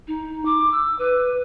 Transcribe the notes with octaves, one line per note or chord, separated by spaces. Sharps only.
D#4
D6
E6
B4